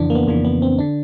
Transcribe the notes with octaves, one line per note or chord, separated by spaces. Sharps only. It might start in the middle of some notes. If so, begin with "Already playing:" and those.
Already playing: F2 C#3 E3 D4
A#3
B3
F2 C#3 E3 A#3
B3
C4
D3 D4